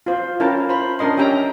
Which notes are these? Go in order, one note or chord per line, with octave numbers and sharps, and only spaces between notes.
F4 C5
C#4 E4 F4 A#4 G5 A5
C5 B5
C#4 D4 A#4 D#5 C6
C#4 G4 E5 G5 A#5